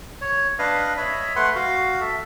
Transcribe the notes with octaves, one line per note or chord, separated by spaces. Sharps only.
C#5
D4 B4 D#5 F5
C#5 D#5 E5 B5
A3 B4 F#5 C6
F#4 F5
A4 E5